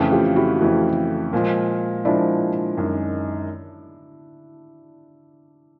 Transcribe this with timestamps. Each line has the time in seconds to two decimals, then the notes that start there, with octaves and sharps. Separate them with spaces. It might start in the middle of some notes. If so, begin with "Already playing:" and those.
Already playing: F2 C#3 E3 A3
0.12 F4 G4
0.36 E4 F#4
0.61 F2 C#3 E3 A3
1.33 A#2 F3 G#3
2.05 A#2 F3 G#3 D4 E4
2.77 F#2 D#3 G#3